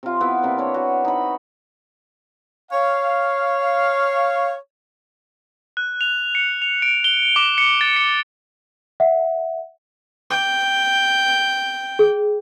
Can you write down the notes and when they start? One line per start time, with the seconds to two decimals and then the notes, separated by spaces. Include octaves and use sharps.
0.03 C3 F4
0.21 B3 E4 B4
0.43 C3 A#3 D5
0.58 D4 B4 C#5
0.74 F#4
1.05 D#4 B5
2.72 C#5 F5
5.77 F#6
6.01 F7
6.35 C#7
6.62 F7
6.82 D7
7.04 G7
7.36 D6
7.58 C#7
7.81 A6
7.96 C#7
9.00 E5 F#5
10.31 G5 D6
11.99 G#4